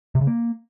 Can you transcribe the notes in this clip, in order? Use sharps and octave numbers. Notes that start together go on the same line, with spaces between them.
C3
C#3
A#3